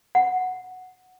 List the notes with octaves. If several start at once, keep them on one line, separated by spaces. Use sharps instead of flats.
F#5